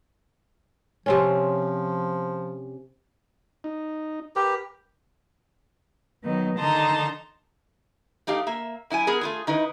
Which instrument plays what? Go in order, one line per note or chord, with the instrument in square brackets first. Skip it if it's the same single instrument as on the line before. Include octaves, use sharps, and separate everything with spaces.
[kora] C3 C4 C#4 [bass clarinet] F3
[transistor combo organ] D#4
[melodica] G4 [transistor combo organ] A#4 B4
[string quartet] D#3 F#3 B3 D#4
D3 D#3 D#4 A5 A#5 C6
[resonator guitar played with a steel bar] A3 D#4 G4 F5
A#3 E5
F#2 E4 F4 G#5
B3 G#4 A#4
A3 F4 G#4
D#3 D#4 E4 B4